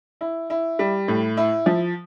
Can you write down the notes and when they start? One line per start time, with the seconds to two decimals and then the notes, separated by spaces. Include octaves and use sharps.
0.21 E4
0.50 E4
0.79 G3
1.08 A2
1.37 E4
1.66 F3